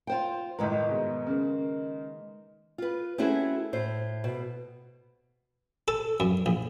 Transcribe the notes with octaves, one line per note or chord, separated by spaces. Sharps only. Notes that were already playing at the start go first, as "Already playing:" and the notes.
F4 C5 G5
G1 A2 D#3 G#3 B4 A#5
G#2 B2
C#3 A#3
F4 B4
A3 C4 C#4 E4 F#4 G#4
A2 C5
B2
A4
F#2
A#1